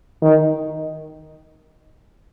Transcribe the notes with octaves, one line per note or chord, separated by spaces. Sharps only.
D#3